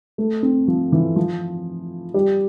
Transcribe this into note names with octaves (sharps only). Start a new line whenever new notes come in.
A3
C4
F3
E3
F3
G3